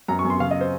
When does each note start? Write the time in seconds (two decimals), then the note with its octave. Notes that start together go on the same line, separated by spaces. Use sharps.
0.08 F#2 A#5
0.19 C#6
0.25 F#2
0.30 C6
0.40 C#3 F5
0.51 D#5
0.61 C5